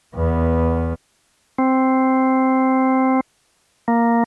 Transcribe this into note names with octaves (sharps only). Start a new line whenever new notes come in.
E2 B3
C4
A#3